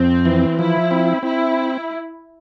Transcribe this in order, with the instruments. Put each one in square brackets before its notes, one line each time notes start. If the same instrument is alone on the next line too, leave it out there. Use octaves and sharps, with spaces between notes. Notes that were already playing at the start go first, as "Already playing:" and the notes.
Already playing: [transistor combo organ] F2 [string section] C4
[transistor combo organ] E3
[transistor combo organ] F3 [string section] E4
[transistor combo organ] C4
[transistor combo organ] C4 [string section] E4